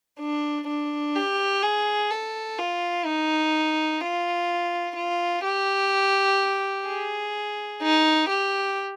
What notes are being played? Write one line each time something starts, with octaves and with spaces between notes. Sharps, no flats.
D4
D4
G4
G#4
A4
F4
D#4
F4
F4
G4
G#4
D#4
G4